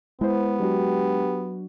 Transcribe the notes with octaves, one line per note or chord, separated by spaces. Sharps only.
G#3 B3 E4 C5
F#3 D4 F#4 G4